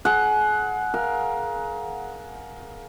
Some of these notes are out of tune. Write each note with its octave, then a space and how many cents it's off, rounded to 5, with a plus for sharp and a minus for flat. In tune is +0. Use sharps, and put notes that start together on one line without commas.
G#4 +35 F#5 +0
A#4 +20 F5 +0